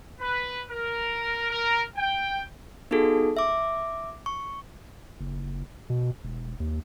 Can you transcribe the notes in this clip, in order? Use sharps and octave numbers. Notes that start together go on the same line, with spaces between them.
B4
A#4
A#4
G5
B3 D#4 F#4 G#4 A4
E5 D6
C#6
F#1
B2
E1
D#2